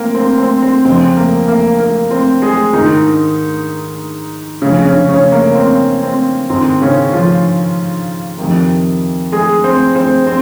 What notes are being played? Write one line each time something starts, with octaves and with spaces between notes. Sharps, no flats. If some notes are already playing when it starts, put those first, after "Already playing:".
Already playing: A#3 C4
C4
C4
C4
F2 C#3 C4
A#3
A#3
A#3
C4
G#3 G#4
G#2 D#3 D#4
F2 C#3 C#4
C#3 C#4
C#3 C#4
A#3
C4
C4
G#2 D#3 C4
C#3 C#4
F3 F4
F2 C3 D#3
G#3 G#4
C4 C5
C4 C5
C4